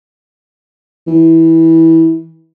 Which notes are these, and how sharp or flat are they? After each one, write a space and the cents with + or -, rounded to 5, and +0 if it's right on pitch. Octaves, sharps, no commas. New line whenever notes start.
E3 -20